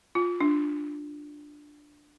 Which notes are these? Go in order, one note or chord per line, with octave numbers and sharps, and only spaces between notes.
F4
D4